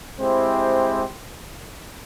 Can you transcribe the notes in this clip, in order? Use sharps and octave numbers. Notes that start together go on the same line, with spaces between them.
G#3 C4 E4 G4 C5